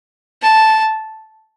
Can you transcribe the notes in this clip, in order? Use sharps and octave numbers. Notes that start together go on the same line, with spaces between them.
A5